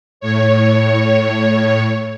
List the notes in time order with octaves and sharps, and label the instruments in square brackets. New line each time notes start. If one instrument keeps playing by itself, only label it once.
[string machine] A2 C#5